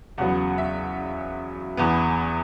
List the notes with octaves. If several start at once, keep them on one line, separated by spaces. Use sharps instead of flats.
E2 C#3 F#3 B3 F#5
E5
E2 E3 B3